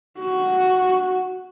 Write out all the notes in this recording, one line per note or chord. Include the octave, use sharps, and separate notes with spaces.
F#4